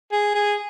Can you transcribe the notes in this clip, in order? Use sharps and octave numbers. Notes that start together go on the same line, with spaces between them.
G#4
G#4